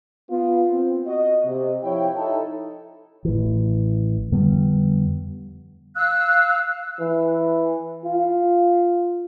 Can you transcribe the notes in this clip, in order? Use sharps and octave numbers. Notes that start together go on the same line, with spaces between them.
B3 F4
C4
F#4 D#5
C3
F3 E4 C#5 G5
D#4 E4 A4
A1 E3
F2 D3 G3 B3
F5 E6 F#6
E3
F4